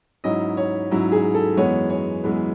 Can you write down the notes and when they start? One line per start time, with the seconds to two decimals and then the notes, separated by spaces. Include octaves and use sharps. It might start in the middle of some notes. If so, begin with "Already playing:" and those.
0.24 G#2 F#3 C#4 E4 D#5
0.57 C#5
0.91 G#2 F#3 C#4 E4
1.12 G#4
1.35 A4
1.57 F#2 E3 G#3 B3 C#5
1.90 C#5
2.24 F#2 E3 G#3 B3